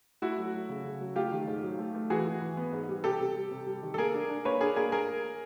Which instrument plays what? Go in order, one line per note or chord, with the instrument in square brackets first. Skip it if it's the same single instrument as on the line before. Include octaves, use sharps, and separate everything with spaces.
[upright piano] A3 E4 F#4
F#3
F#3
C#3
C#3
F#3
A3 F4 G4
D#3
G#2
F#3
A3
A3
E3 F#4 G#4
E3
E3
B3
G#2
G3
C3 G4 A4
C3
G3
C3
G3
D#3
A4
A#3 G#4 A#4
D4
D4
A#3 B4 C#5
D4 G#4 A#4
A#3 G#4 A#4
G#4 A#4